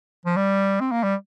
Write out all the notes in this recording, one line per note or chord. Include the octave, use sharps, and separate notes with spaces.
F3
G3
C4
A#3
G3